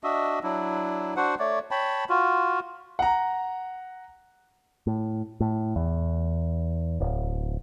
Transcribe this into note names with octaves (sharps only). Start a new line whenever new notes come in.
D4 F#4 D#5 E5
F#3 D4 E4
D4 F#4 C5 F#5
A3 C#5 D5
C#5 G5 A5 B5
F4 F#4
F#5 A#5
A2
A2
E2
D1